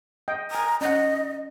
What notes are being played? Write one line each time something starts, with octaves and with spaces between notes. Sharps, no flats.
D#5 G5
G#5 A#5 D#6
C#4 D#5 F#5